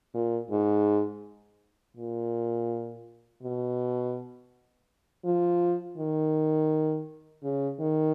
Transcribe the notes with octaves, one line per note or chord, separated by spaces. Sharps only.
A#2
G#2
A#2
B2
F3
D#3
C#3
D#3